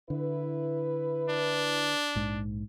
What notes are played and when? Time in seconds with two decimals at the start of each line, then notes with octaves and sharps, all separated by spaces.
0.10 D3 E4 B4
1.30 D4
2.15 A#1 G#2